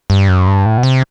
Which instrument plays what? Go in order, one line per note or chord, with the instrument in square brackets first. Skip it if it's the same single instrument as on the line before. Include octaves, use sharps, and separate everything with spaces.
[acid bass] G2
F#2
G2
A2
B2
C3